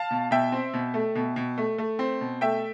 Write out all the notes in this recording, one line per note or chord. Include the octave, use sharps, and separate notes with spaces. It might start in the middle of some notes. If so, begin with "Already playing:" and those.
Already playing: F5 A5
B2
B2 E5 G5
C4
B2
A3
B2
B2
A3
A3
C4
B2
A3 E5 G5